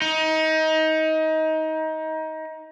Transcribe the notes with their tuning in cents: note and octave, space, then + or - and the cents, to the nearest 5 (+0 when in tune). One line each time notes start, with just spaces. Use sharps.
D#4 +25